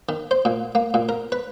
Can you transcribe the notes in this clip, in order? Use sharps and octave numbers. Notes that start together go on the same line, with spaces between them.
D#3
C5
A#2
A#3
A#2
A#4
B4